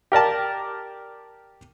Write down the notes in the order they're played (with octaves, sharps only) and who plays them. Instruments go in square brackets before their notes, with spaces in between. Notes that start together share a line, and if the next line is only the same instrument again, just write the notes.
[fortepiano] G4 A#4 D5 A5